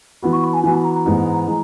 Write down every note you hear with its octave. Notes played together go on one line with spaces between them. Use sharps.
E3 B3 F#4 B5
C#6
B5
G#5
E3 B3 F#4 G#5
B5
A#5
A#5
G#2 E3 G#3 B3 D#4
E3 G#3